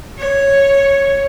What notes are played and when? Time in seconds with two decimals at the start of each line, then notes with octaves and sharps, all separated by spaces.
0.18 C#5